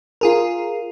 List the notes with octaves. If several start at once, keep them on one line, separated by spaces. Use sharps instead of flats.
F4 G#4 A#4